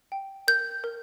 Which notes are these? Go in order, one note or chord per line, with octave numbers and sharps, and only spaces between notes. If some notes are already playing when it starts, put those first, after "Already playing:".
G5
A#4 G6
A#4